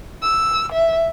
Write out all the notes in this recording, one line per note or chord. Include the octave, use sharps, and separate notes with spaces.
E6
E5